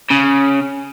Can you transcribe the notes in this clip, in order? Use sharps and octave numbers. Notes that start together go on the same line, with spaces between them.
C#3